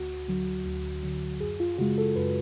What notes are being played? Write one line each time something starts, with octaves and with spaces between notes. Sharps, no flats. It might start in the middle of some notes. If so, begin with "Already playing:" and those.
Already playing: D2 F#4
D3 F#3
D2
D3 F#3
F#2 G#4
F4
C#3 G#3 F#4
A4
F#2 B4